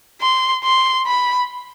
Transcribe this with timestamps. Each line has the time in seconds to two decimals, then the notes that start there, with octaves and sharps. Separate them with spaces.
0.21 C6
0.64 C6
1.06 B5